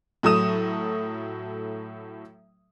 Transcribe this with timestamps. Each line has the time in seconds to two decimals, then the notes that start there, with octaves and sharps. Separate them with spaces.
0.23 A2 F#3 A4 D#6 E7